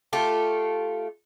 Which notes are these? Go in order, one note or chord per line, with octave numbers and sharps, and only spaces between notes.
A3 F4 G4 A4